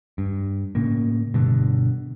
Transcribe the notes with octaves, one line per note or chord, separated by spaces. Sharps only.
G2
A2 C#3 A#3
G2 B2 D3